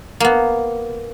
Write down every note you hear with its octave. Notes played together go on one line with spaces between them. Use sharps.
A#3 B3